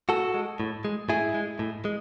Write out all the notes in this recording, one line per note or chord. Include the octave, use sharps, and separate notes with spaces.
A2 F#4 A4
G#3
A2
G#3
A2 E4 G#4
G#3
A2
G#3